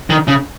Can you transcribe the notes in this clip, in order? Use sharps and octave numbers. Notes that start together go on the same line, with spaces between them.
D#3
C#3